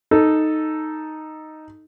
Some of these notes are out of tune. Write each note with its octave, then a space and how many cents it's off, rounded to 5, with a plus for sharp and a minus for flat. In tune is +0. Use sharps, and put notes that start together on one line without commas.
D#4 +0 A4 +0